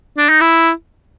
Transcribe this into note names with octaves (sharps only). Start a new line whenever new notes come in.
D4
D#4
E4